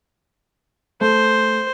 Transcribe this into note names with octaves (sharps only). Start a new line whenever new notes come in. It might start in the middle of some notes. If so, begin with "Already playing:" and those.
A3 C5